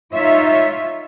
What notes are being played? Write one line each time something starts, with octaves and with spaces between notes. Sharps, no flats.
D#4 F4 C#5 E5